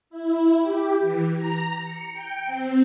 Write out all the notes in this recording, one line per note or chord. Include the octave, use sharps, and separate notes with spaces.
E4
G4
E3
A#5
C#7
G5
C4